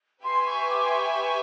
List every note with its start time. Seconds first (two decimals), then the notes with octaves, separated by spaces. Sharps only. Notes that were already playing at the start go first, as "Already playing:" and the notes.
0.22 G4 B4 E5 G#5 C6
0.45 C#6
0.67 D6
0.82 C6
0.90 C#6
1.13 C#6